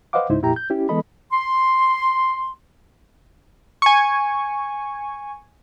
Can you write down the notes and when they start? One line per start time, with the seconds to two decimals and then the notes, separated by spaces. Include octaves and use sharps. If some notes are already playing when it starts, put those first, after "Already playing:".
0.13 B4 C5 D#5 F5 F#5 D6
0.30 C#2 G#2 D#4 E4 C5
0.42 F2 A#2 E4 G4 G5 A#5
0.56 G6
0.70 C#4 E4 G4
0.89 E3 G#3 B3 A4 D#5 B5
1.31 C6
3.82 G#5 C#6